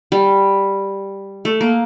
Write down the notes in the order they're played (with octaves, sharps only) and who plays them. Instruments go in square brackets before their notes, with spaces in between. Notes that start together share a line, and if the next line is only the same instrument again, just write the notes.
[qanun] G3
A3
A#3